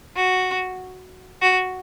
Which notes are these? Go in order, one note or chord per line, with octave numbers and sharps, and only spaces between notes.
F#4
F#4